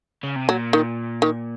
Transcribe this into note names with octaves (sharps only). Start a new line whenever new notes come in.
C#3
C3
A#2 F#3
D#3
D#3